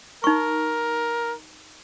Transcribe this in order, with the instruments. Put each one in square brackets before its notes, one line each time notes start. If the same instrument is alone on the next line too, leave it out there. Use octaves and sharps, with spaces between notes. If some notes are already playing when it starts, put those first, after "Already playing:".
[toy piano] D#4 C#6 [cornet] A#4